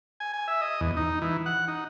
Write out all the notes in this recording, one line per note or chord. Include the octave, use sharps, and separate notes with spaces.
G#5
G#5
E5
D#5
E2
D#4
E3
F#5
D#4